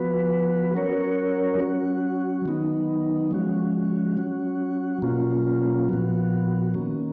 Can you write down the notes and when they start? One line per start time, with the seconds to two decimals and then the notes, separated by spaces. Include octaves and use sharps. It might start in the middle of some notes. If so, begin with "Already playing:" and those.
Already playing: F3 B3 F#4 B4
0.74 F#3 C#4 F#4 A#4 C#5
1.59 F#3 C#4 F#4
2.46 D#3 F#3 B3 D#4
3.31 F3 G#3 C#4 F#4
4.17 F#3 C#4 F#4
5.02 B2 F#3 A#3 C#4 F4
5.89 A#2 F3 B3 F#4
6.74 D#3 A#3 C#4